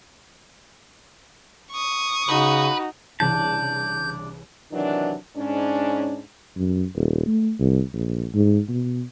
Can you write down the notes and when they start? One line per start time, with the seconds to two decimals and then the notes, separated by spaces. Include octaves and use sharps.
1.72 C#6 D#6
2.29 C#3 D#4 F#4 B4
3.20 C2 C#3 E3 D4 A5 G6
4.72 C3 D#3 E3 F#3 D4
5.36 G#2 C#4 D4
6.57 F#2
6.96 D#1
7.27 A3
7.59 C2
7.93 A#1
8.34 G#2
8.69 B2